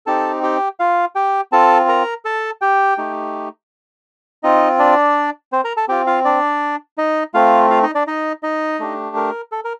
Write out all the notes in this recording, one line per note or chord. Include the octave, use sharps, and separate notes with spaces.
C4 D#4 G4 A4 A5
G4 G5
F4 F5
G4 G5
C4 F4 A4 A5
A#4 A#5
A4 A5
G4 G5
A3 D#4 G4
C4 D#4 F4 D#5
D4 D5
C4 C5
A#4 A#5
A4 A5
C4 F4 G4 G5
F4 F5
D4 D5
D#4 D#5
A3 C4 F4 F5
F4 F5
D#4 D#5
D4 D5
D#4 D#5
D#4 D#5
A3 D4 G4
A#4
A4
A#4